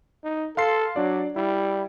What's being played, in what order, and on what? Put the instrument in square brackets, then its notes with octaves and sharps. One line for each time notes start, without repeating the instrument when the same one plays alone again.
[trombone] D#4
[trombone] A4 [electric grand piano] F5 C6 C7
[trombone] F#3 [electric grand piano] D4 D5
[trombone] G3 [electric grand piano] E4